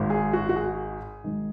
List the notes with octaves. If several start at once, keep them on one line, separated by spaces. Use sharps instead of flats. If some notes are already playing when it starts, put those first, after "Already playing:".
Already playing: G#1 G#2 D#3
G#4
F#4
F#4
G#4
G#1 G#2 D#3